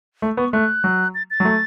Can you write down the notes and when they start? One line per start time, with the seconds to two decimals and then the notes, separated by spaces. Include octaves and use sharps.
0.22 A3
0.37 B3 C#6
0.53 A3 F#6
0.84 F#3
1.15 A6
1.31 A6
1.40 F#3
1.45 A3